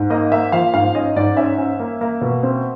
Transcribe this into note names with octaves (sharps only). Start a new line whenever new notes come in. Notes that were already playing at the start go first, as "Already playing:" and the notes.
Already playing: G#2
A#3 D#5
A#3 E5
F3 F5
G#2 F5
C#4 D#5
G#2 D5
C#4 E5
C#4
A#3
A#3
B2
C4